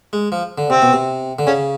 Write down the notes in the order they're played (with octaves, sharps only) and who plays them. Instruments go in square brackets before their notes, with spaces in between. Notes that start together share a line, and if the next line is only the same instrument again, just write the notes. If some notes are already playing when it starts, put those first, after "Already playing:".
[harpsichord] G#3
F3
D3
[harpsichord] C3 [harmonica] C4
[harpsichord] B2
C3
D3
[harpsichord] C#3 [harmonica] C#4